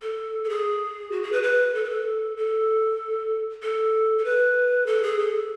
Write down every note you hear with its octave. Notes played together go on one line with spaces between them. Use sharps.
A4
A4
G#4
F#4
G#4
B4
B4
A4
B4
A4
A4
A4
A4
B4
A4
G#4
A4